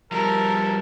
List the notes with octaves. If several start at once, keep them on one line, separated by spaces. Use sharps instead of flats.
F3 G3 A4 A#4